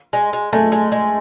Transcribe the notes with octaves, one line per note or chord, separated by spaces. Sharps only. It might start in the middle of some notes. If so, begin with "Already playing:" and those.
G#3
G#3
G#3 A3
G#3
G#3